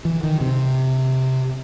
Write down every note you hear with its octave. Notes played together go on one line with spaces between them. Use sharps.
E3
D#3
C3